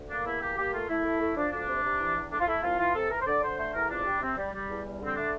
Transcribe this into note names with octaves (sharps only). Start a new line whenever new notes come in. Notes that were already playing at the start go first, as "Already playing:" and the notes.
Already playing: D2
A#3 D4
E2 E4
A#3 G4
A#3 G4
A3 F4
A3 E4
A3
A3
F3 D4
D2 D4
C3
C3
E3
E2
A3 D4
F4
A3 E4
C2 F4
E3 F4
C3 A4
E3 A#4
C5
D3 D5
D3 C5
A3 C5
E2 A#4
F2 D4
G3
C3 C4
G3
G3
E2
G3
D3 C4
A3 D4